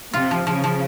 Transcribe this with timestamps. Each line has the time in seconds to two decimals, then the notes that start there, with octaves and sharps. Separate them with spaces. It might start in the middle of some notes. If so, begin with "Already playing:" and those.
0.14 C3 F4
0.31 F3
0.47 C#3 F3
0.64 F3